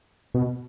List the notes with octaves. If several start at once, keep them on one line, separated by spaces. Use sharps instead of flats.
B2